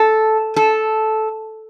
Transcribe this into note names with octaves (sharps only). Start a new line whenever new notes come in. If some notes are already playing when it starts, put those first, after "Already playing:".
Already playing: A4
A4